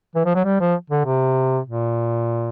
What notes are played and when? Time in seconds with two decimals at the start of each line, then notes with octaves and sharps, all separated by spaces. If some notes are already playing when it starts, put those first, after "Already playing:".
0.16 E3
0.25 F3
0.35 F#3
0.45 G3
0.61 F3
0.90 D3
1.05 C3
1.65 A#2